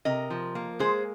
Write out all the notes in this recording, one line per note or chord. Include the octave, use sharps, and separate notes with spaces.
C3 A#4 D#5
F3
A#3
G#3 G#4 C5